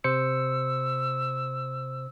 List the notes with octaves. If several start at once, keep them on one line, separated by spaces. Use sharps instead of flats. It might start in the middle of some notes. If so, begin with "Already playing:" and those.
C3 C5 E6 C#7